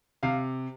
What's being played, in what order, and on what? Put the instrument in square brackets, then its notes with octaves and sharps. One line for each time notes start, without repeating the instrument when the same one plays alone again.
[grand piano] C3 F5